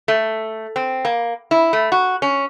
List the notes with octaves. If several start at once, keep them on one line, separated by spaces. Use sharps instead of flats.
A3
C4
A#3
E4
A3
F#4
C#4